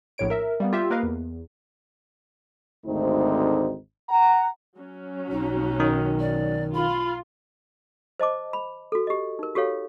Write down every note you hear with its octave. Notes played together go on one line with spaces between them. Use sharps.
A#1 A2 C#5 D7
A#4 E5
G3 A#3 B3
F4 G4 E5
A#3 A#4 B4 D#5 F5
E2
G#1 D2 A3 C4 D#4 C5
F#5 A#5
F#3 C#4
B1 D#4
D#3
D5
F4 B5
C5 D#5 A5 D6
B5
F#4 A4
G4 D#5
D#4 A#4
F#4 G4 A4 C#5 F5